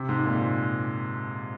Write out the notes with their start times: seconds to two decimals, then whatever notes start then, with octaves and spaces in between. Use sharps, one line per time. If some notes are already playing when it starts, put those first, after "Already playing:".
Already playing: C3
0.09 G#2
0.26 A#2